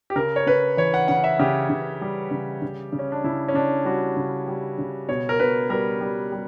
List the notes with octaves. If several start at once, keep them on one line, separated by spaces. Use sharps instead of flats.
G4
C#3 A#4
C#5
C#3 B4
E3 C#5
F#5
C#3 F#5
E5
C#3 G4
C#3
G3
C#3
C#3
C#3
C#4
D4
C#3 E4
C#4
C#3 D4
G3 F#4
C#3
G3
C#3
B2 C#5
A#4
B2 B4
G3 A#4
G3
G3